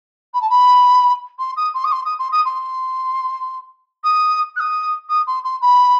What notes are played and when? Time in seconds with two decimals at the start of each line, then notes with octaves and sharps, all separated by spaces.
0.34 B5
0.41 A5
0.50 B5
1.39 C6
1.57 D#6
1.74 C6
1.84 D#6
1.92 C6
2.05 D#6
2.19 C6
2.32 D#6
2.46 C6
4.04 D#6
4.56 F#6
4.60 D#6
5.09 D#6
5.27 C6
5.44 C6
5.62 B5